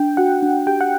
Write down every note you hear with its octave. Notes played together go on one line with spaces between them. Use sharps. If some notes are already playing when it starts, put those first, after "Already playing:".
Already playing: D4 G5
F#4 F#5
D4
G4 G5
F#5